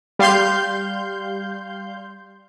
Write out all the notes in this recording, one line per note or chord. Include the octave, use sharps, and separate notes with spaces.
G3 F5 C6 G6